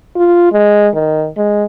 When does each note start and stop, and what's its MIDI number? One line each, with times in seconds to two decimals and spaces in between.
0.16 0.50 65
0.52 0.88 56
0.94 1.27 51
1.37 1.64 56